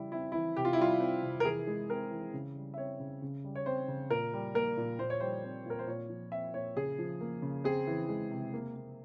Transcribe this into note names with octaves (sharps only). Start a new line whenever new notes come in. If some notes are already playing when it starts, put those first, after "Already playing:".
Already playing: C#3 E3 G3 E4
C4 E4
E4
E3
C3 G4
F4
E4
G3 F4
C4
C3
A#4
E3 G#4
G#3
C4 A#4
E3
C#3
G3
E5
C4 C#5
C#3
C#3
G3
C#5
C4 C5
C#3
A#2 A#4
G3
A#3 A#4
A#2
A#2 C5
C#5
G3 C5
C4
A#2 A#4
C5
A#2 C#5
F3
C4 E5
A#2 C#5
C#3 G#4
F3
A#3
C#3
C4 G#4
E3
G#3
C3
A#3
A#3